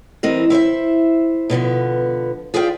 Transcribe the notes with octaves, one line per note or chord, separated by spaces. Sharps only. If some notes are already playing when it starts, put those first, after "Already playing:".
E3 G3 C4 A#4 D#5
E4 C5 C#5 E5
B2 D3 F3 B3
F4 G#4 D5 E5 F5 G5